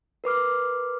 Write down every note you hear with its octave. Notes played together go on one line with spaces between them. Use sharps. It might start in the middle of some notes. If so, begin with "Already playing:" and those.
A#4 B4 D6 F6